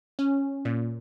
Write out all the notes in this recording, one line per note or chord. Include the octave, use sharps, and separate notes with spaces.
C#4
A#2